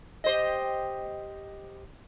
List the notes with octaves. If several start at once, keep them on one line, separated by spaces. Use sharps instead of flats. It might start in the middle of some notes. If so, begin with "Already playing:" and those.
G4 C5 D#5